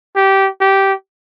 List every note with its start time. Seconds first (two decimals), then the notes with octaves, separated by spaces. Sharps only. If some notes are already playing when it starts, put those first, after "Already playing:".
0.16 G4
0.61 G4